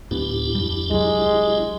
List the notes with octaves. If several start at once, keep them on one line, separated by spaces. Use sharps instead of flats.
D1 A2 B3 D4 E4 G4
F2 G3
C2 F#3 G#3